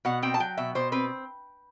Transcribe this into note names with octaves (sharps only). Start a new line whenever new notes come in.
B2 F#5
C4 G5
A5
F#3 G5
B2 E5
B2 C5
C4 B4